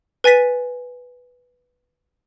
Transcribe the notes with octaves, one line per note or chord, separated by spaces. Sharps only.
B4 G#5 A6 B6 D#7